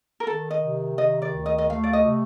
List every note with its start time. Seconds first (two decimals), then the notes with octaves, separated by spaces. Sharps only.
0.20 A#4
0.27 D#3 A4
0.51 D#5
0.63 C3
0.98 D#3 D#5
1.22 D5
1.34 D2
1.46 D#5
1.58 D#5
1.70 A3 F5
1.84 D5
1.93 D#5
2.05 C3